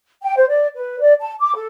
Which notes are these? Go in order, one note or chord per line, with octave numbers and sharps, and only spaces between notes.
G5
C5
D5
B4
D5
A5
D6
A4